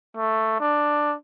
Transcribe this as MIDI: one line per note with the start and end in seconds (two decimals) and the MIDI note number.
0.17 0.58 57
0.60 1.15 62